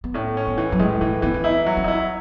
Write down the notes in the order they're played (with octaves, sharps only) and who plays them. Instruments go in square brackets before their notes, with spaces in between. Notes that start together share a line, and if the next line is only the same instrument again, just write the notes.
[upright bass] B3
[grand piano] A2 [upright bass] C#4
[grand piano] C#4
[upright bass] B3
[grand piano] E3
[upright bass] F#3
[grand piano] A2 [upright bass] G#3
[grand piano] E3 [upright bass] A3
[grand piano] E3 [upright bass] B3
[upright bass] C#4
[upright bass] D#4 [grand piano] E4
[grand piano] F#3
[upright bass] C#4
D#4
[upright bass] C#4 [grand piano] E4